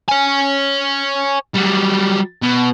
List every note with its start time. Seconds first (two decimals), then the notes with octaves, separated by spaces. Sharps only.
0.08 C#5 G#5
1.54 F#3 G3
2.42 B2